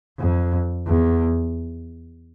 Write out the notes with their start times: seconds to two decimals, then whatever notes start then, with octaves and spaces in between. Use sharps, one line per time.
0.19 F2
0.87 E2